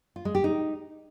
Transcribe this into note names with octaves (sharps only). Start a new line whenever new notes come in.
F4
G#3
G4
D#4